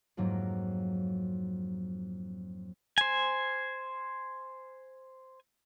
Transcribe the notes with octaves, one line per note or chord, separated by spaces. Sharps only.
F2 G#2 F#3 A#3
C5 G#5